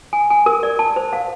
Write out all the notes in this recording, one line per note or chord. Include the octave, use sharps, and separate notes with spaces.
G#5
G#5
A#4
D5
A5
C5
F5